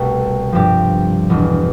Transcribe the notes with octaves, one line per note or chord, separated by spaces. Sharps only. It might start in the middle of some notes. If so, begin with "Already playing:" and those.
Already playing: C2 B2 A3
G2 F3 C4 G4
E1 E2 B2